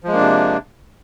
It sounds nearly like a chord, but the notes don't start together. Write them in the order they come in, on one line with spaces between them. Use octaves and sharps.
F3 G#3 A#3 D4 C3